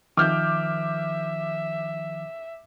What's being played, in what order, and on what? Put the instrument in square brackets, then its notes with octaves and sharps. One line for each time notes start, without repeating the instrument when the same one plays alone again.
[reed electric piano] D#3 F3 [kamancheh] E5 [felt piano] D6 F6 G6